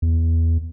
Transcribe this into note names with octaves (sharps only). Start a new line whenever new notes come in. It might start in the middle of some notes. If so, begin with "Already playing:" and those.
E2